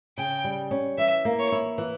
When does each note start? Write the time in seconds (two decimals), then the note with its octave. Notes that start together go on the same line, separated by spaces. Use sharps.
0.17 C#3 G5
0.44 G3
0.71 C#4
0.98 E3 E5
1.25 A#3
1.38 C#5
1.52 E4
1.78 E3